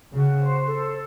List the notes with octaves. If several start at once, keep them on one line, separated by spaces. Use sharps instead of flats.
C#3 F#4
C5
A4